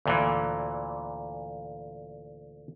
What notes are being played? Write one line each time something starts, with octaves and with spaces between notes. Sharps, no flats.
D2 A#2 E3